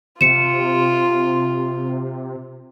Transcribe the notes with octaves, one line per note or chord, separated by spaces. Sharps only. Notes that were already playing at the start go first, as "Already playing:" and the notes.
C3 F4 C#7 E7